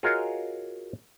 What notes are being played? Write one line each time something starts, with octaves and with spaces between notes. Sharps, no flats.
F4 F#4 G#4 A#4 C#5 D#5